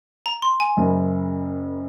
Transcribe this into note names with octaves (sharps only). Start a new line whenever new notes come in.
A#5
C6
G#5
F#1 F#2 C#3